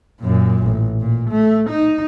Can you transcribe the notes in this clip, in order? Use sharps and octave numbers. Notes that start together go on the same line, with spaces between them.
F#2 A#2
A1
A#2
A3
D#4